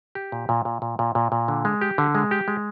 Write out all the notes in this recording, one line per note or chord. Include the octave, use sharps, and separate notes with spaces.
G4
A#2
A#2
A#2
A#2
A#2
A#2
A#2
D3
G#3
G4
D3
G#3
G4
G#3